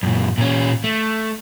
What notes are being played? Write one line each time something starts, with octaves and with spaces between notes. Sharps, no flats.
F#2 A#2
A#2 C#4
A3